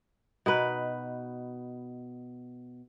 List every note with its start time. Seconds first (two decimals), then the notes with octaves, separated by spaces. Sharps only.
0.46 B2 D#4 B4